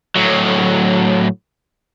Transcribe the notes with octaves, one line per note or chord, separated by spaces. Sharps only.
A2 F#3